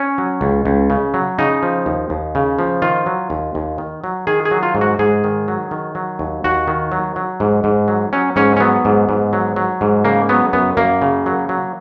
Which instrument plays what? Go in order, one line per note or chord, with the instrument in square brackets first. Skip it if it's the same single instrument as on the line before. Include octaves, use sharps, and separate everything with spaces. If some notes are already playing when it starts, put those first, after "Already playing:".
Already playing: [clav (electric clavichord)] C#4
F#3
C#2
C#2
C#3
F#3
C#3 D#4
F3
D#2
D#2
C#3
F3
D#3 F4
F#3
D#2
D#2
D#3
F#3
D#3 G#4
G#4
F#3
F4
G#2
F#4
G#2 G#4
D#3
F#3
D#3
F#3
D#2
D#2 F#4
D#3
F#3
F#3
G#2
G#2
F#3
F#3 C#4
G#2 C#4
C#4
F#3 B3
G#2
G#2
F#3
F#3
G#2
C#3 A#3
F#3 B3
F#2 B3
F#2 A#3
C#3
F#3
F#3